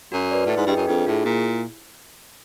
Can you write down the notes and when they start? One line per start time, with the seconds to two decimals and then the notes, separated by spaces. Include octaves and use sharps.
0.12 F#2 F#4
0.31 B4 D5
0.46 A2 E4
0.57 G#2
0.66 G2 G#4 B4 D#5 G5
0.76 F#2
0.87 F2 D4
1.06 A2 F4 G#4
1.25 A#2 E4